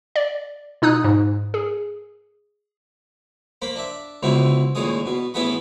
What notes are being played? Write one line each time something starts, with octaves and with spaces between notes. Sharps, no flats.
D5
B2 D#4 D#6 F#6
G#2
G#4
A#3 C5 B5
D4 E5
C#2 B2 D3 C4 E4
A1 D#2 A#2 G#3 G#4 D#6
B2
A1 B3 E4 G#4 F#5 B5